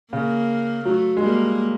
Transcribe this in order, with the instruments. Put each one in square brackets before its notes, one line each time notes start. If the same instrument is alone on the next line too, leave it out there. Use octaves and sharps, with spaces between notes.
[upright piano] C#3 [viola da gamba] A#3
[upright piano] F#3 [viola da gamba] A3
[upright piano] G#3
[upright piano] G3 [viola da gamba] A#3